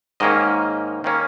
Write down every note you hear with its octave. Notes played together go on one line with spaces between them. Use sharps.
G#2 D#3 A#3 C#4 D#5
D#3 A#3 C#4